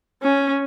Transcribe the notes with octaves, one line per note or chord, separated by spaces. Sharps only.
C#4